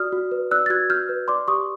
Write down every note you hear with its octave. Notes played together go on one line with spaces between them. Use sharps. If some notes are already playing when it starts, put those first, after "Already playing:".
Already playing: F#4 D5 D#6 F6
F#4
B4
D5 E6 F#6
A6
F#4 F#6 G#6
F#4 F6 G6
B4
D5 C6 D6
G4 C#6 D#6